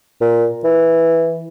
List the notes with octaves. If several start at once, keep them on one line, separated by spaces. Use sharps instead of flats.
A#2
E3